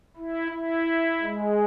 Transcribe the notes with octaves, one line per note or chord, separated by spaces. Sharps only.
E4
E4
G#3